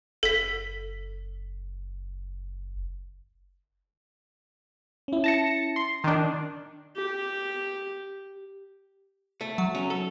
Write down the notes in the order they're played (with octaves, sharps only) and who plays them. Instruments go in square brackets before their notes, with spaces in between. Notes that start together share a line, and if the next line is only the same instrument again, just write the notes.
[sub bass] F#1 [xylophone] A4 B6
[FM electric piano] C#4 E4
[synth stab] A5 A#6 C#7
C6
D#3 D4
[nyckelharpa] G4
[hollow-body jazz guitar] A3
[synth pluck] F#3
[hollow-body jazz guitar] C#4
A4